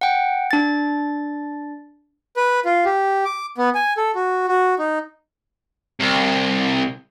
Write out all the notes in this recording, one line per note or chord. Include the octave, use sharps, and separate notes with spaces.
F#5 G5
D4 A6
B4
F4
G4
D6
B3
G#5
A4
F#4
F#4
D#4
C2